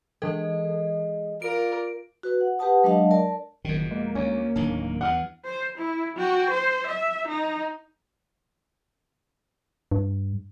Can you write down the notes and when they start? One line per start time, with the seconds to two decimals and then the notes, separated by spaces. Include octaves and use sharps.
0.22 E3 G#3 A4
1.42 F4 A#4 D5 D7
2.23 F#4 B4
2.41 F#5
2.59 G4 B4 F#5 A5 D#6
2.84 F#3 G#3 D4 D#5 F5 A5
3.11 A#4 D5 A5
3.65 F#1 F2 B2 D#3
3.91 G#3 A#3
4.15 D2 C#4
4.56 D1 D#2 D#3 D4
5.01 E2 G2 F#5 F6
5.45 C5
5.78 E4
6.16 F#4 G5
6.51 C5
6.87 E5
7.28 D#4
9.92 G2